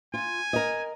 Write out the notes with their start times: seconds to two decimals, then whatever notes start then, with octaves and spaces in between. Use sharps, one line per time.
0.14 F4 G#5
0.53 A#4 D#5